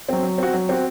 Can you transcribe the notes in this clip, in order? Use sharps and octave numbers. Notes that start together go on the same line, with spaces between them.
F#3 C4
F#3
C4 F#4
F#3
C4 F#4